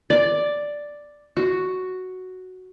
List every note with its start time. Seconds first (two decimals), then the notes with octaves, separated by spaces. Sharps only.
0.10 D5
1.37 F#4